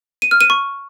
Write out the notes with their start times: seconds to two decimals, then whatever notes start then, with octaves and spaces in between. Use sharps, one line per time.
0.22 D#7
0.31 F6
0.41 D#7
0.50 C#6